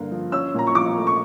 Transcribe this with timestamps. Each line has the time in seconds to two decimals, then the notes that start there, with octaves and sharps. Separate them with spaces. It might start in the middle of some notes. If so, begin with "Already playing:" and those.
Already playing: G2 D3 A#3
0.11 F3
0.32 C#4 E6
0.54 A#2 A#5
0.67 C#6
0.75 F3 D6
0.97 A3
1.07 C#6